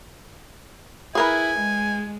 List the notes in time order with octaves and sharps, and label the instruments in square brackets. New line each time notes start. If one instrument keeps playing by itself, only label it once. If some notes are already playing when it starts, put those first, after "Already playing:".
[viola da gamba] E4 [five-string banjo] G#4 A#4 B4 [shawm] G#5
[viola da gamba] G#3